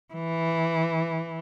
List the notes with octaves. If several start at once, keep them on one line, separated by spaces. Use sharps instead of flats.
E3